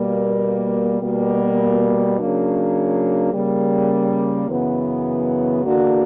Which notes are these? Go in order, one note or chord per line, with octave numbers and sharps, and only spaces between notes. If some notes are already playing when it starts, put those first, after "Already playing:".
Already playing: B2 G3 A#3
B2 G3 A#3
C#3 F#3 A#3 D4
C#3 G3 A#3
F#2 C#3 E3 B3
E2 D3 A#3 D4 F#4